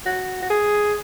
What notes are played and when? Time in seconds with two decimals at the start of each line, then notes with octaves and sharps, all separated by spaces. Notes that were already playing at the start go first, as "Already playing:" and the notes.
0.06 F#4
0.42 F#4
0.50 G#4